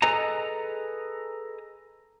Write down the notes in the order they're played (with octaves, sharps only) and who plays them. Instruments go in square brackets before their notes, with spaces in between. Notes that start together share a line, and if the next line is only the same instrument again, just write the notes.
[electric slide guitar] G#4 A4 B4 D#5 G#5 A#5